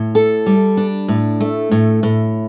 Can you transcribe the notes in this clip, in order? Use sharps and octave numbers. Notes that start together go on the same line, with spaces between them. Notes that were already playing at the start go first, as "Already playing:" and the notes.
Already playing: A2
A4
G3
D4
A2
A3
A2
A2